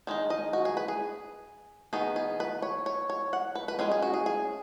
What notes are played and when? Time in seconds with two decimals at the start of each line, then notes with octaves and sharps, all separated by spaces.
0.07 D#3 G#3 D#4
0.30 D#5
0.53 F#4
0.65 G#4
0.77 B4
0.88 G#4
1.93 D#3 B3 D#4 G#4
2.16 G#4
2.40 B4
2.62 C#5
2.86 C#5
3.10 C#5
3.33 F#5
3.55 B4
3.68 B4
3.79 G#3 C#4 G#4
3.91 G#4
4.02 F#4
4.14 G#4
4.26 G#4